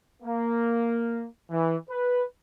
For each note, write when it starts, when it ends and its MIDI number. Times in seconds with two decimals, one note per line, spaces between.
0.23 1.25 58
1.51 1.76 52
1.90 2.23 71